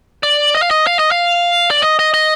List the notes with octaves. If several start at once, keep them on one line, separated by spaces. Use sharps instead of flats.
D5
D#5
F5
D#5
F5
D#5
F5
D5
D#5
D#5
D#5